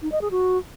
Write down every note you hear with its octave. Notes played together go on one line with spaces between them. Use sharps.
D#4
D#5
G#4
F#4